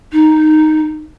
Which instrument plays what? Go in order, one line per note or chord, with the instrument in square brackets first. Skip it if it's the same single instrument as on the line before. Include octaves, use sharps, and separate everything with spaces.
[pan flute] D#4